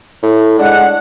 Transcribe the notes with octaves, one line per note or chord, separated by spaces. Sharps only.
A2
G#3 D4 F#5